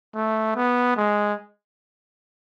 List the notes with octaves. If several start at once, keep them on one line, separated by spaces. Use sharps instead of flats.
A3
B3
G#3